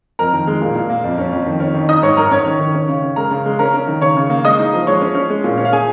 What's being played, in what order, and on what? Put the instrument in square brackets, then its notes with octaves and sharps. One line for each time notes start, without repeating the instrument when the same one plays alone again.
[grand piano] F2 A#4 A#5
D#3
G#3
A#2
A#2
A#3
F2
C#4
F2
D#3
C#4
D#3
D#4 D#5 D#6
G#2 C#5 C#6
G#2 A#4 A#5
C#4 C#5 C#6
D#3
D#3
C#4
C#3
C#4
G#3 A#4 A#5
C#3
G#3
C#4 A#4 A#5
C#4
D#3
C#3 C#5 C#6
C#3
A#3
G#3 D#5 D#6
D#4
F3
G#3 C#5 C#6
C#4
C#4
G#3
A#2
C#4
F5
G#4 G#5